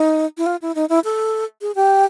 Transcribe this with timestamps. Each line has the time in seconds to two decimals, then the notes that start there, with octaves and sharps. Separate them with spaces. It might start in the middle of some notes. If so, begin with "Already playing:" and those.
Already playing: D#4
0.38 E4
0.46 F4
0.62 E4
0.75 D#4
0.89 E4
1.05 A4
1.62 G#4
1.75 G4